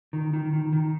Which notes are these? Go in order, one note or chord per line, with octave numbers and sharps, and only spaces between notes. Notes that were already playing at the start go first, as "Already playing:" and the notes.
D#3
D#3
D#3
D#3